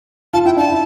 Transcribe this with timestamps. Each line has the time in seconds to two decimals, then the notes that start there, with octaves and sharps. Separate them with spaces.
0.33 F4 A5
0.45 E4 G5
0.57 D4 A5
0.70 E4